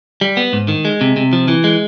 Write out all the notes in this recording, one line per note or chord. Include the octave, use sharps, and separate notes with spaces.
G3
B3
G#2
D#3
G#3
C3
C3
F3
E3
G#3